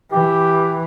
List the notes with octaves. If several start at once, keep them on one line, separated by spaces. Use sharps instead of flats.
E3 G4